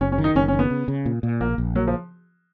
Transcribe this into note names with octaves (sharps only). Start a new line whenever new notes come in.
F#1 C#4
C#4
D#3
D#4
F#1 C#4
C#4
D#3
B3
C#3
C#3
A#2
A#2
A#1 A#3
A#1
F#3 A#3
F3